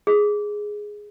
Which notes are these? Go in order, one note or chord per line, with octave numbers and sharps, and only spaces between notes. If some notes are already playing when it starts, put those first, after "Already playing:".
G#4